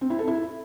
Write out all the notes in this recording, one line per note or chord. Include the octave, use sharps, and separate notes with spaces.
C4
E4
A4
E4